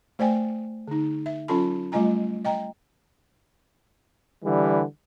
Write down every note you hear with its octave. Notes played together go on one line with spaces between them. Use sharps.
A3 C5 D5 G5 G#5
D3 D#4
E5
F#3 C#4 F4 A4 A5 B5
G3 A3 F4 D#5 G#5 A#5
D#5 G5 A#5
D3 E3 G3